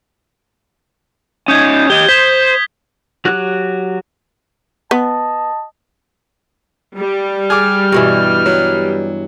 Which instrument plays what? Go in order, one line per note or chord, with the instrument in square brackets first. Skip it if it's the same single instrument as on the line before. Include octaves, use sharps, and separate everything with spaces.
[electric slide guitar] C#4 D#4 [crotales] D#6 G6 G#6
[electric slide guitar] G4 D#5 [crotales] G7
[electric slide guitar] C5 [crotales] B6
[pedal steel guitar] F#3 F#4 G4 F#6
[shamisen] B3 [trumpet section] D#5 A5
[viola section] G3
[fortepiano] G#4 D6 [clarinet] F6
[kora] G2 B2 E3
[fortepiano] F#3